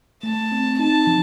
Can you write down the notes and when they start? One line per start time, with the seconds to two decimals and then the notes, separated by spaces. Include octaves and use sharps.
0.23 A3 A5
0.52 C4
0.79 D#4 A5
1.07 F3